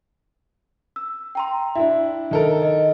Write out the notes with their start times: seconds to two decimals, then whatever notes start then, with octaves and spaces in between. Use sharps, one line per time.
0.96 E6
1.35 G5 A#5 C6
1.75 D4 E4 E5
2.31 D#3 A4 A#4
2.62 D#5